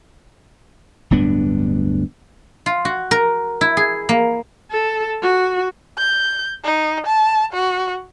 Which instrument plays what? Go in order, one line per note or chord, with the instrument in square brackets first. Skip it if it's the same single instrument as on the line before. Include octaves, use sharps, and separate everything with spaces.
[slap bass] D1 G2 B3 D4
[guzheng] F4
F#4
A#4
E4
G#4
A#3
[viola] A4
F#4
[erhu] G6
D#4
A5
F#4